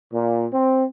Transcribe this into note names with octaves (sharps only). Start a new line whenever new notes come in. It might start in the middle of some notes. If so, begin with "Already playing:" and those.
A#2
C4